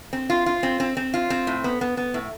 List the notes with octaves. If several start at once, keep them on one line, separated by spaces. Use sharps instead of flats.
C4
F4
F4
C4
C4
C4
F4
C4
A2
B3
B3
B3
A2